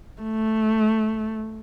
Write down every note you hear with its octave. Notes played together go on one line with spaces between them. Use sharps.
A3